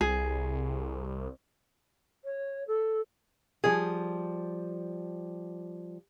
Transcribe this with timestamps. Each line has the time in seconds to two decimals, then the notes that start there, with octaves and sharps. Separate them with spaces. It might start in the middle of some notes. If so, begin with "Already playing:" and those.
0.01 C2 G#4
2.24 C#5
2.67 A4
3.64 F3 G3 G#4